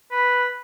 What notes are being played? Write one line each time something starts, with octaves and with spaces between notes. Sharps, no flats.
B4